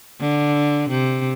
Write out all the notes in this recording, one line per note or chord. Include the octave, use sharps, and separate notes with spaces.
D3
C3